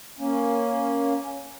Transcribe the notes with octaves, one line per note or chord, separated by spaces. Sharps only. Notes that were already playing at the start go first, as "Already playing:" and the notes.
A#3 C#4